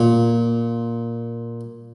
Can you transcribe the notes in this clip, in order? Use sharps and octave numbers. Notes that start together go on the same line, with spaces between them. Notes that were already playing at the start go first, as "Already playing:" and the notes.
Already playing: A#2